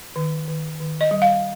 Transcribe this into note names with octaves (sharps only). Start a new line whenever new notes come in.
D#3
D#3
D#3
D#5
G3
F5